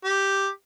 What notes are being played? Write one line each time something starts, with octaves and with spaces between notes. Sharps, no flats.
G4